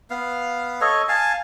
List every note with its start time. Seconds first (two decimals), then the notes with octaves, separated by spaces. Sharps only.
0.10 B3 F5
0.81 A4 C#5 D#5
1.08 F5 G#5 A5